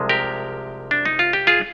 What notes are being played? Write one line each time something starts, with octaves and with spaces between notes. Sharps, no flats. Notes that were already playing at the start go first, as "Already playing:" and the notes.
Already playing: C2 C3 F3 G#3
G4 A#4
D4
D#4
F4
G4
F4 G#4